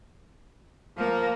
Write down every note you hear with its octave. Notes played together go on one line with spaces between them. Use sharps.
F3 A#3